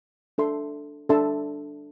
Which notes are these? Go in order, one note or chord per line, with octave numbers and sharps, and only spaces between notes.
D4 A4 E5 A5 C6
D4 A4 E5 A5 C6